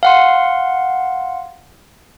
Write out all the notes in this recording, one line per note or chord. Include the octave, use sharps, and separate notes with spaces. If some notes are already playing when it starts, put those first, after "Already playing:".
F5 F#5 C6